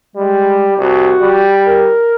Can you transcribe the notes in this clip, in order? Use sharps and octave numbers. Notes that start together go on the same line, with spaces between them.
G3 G#3
C2 F#4
G3
A#4